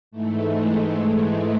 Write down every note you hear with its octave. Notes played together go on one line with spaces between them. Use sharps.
G#2 E3 A3
G#3
G#3
A3